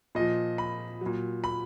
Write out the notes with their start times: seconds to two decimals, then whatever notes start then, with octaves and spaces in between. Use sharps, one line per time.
0.15 A#2 F3 D#5
0.58 B5
1.01 A#2 F#3
1.44 B5